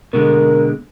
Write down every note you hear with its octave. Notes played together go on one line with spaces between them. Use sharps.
B2 D3 G#3 A#4